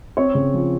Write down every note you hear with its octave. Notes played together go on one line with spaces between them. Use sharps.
C4 C#5 C#6
C#3
F3